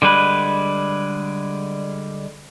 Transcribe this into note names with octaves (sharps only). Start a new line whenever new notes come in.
D3 G3 G#3 B4